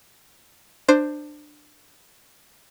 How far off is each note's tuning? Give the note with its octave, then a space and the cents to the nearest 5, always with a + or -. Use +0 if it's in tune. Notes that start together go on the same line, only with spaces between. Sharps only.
D4 +20 C5 +0